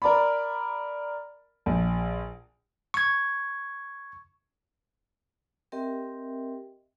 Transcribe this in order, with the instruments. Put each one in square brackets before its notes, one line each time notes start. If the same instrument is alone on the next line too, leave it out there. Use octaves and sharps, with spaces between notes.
[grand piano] A#4 D5 B5
A#1
[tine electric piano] C#6 G#6
[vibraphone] C4 G4 A#4 D#5 E5 G5